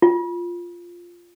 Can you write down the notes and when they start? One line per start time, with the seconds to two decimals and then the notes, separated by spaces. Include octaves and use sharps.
0.02 F4